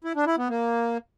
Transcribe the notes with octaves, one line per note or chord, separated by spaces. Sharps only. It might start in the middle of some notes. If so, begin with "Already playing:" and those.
E4
D4
E4
B3
A#3